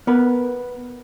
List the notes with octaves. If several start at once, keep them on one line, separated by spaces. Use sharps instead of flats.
B3 A#4 B4